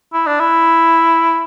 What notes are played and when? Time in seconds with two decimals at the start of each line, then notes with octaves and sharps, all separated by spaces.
0.13 E4
0.27 D4
0.40 E4